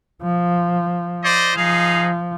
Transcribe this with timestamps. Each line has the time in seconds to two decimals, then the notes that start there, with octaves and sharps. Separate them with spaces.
0.23 F3
1.23 C5 D5 D#5
1.57 F3 D#4 G#4 F5